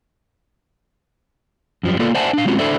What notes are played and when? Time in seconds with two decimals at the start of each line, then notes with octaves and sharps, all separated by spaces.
1.83 F#2 F3 G3
1.99 A#3 B3 F4 A4 D5
2.15 C5 D5 E5 F#5 G#5 A5
2.33 D4 F5
2.45 G3 G#3 C4 C#4 F4 F#4
2.58 D4 E4 A4 C5 D5 E5